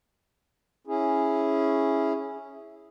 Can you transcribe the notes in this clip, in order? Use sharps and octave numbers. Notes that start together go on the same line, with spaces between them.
C#4 E4 G#4